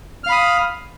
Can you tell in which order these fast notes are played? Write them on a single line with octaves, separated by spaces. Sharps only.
F6 F5 B5 D#6